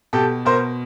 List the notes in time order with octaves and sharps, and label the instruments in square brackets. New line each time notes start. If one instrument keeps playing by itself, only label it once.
[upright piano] B2 G4 A4
B2 A#4 C5